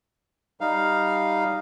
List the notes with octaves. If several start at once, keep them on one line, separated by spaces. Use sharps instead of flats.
G3 D#4 F5